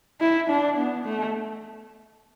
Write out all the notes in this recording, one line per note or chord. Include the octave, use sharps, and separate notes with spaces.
E4
D4
B3
A3